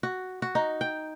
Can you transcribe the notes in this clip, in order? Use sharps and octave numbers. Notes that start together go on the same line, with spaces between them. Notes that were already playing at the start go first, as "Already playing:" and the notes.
F#4
F#4
D#4
G5